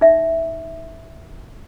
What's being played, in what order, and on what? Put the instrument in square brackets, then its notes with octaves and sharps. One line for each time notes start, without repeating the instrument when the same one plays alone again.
[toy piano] D#4 E5